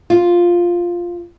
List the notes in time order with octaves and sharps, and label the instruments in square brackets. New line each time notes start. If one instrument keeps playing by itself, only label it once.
[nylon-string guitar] F4